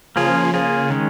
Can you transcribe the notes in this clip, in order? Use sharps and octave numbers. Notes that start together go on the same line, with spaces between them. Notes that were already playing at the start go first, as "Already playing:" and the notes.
C#3 F3 A#3 F4 G#4
C#3 A#3 F4 G#4
D#3 G#3 C#4